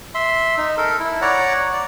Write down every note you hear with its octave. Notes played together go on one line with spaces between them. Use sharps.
E5 C6
D#4
A4 A#4
E4
C#5 D5 F#5 A#5
D5